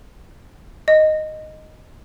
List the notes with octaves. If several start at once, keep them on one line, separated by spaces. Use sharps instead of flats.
D#5